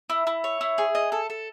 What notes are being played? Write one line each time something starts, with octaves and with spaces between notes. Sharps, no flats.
E4
E4
C#5
E4
G#4
D#5
A4
A4